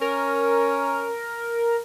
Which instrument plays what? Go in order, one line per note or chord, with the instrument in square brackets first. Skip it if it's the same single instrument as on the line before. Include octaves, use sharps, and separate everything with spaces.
[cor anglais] C#4 [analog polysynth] A#4